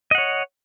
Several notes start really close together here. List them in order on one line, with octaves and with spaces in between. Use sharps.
D#5 F#5 C#5